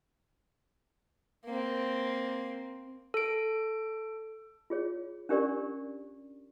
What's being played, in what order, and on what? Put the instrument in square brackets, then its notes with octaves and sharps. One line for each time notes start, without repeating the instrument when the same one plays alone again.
[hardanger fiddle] A#3 C4
[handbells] A4 D7
[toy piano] F4 G#4 C#5
C#4 D4 G4 A#4 D5 C#6